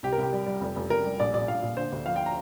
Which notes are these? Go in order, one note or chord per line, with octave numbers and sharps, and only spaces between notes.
C2 G4
A#4
C2
G4
G3
G3
F1
F1
F1 A#4
G3
A#1 D5
A#2 D5
A#1 F5
A#2
D3 C5
D2
F3 F5
G5
A#5